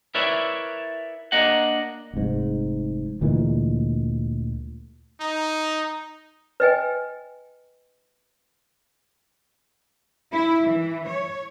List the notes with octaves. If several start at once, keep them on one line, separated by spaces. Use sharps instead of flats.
E4 A#4 B4 C#5 D5 E5
A#3 D4 D#5 F#5
F1 G#2
D2 A#2 E3 G#3
D#4
B4 D#5 G5 G#5
E4
E3
C#5